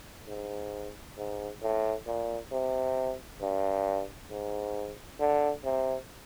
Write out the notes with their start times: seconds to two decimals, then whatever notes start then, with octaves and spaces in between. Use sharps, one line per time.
0.27 G#2
1.17 G#2
1.62 A2
2.07 A#2
2.51 C3
3.41 G2
4.30 G#2
5.20 D3
5.64 C3